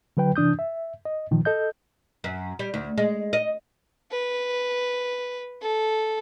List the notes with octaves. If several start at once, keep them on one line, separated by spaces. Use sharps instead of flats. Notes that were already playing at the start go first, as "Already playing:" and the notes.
D3 F#3 B4 G5
C3 E3 D4 D#6 G6
E5
D#5
A#2 D#3 F3
A4 D#5 G6
F#2
G3
D2
G#3
D#5
B4
A4